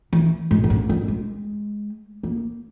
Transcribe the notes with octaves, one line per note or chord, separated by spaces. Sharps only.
E3
G#2
A#2
G#2
G3
G#3
A#3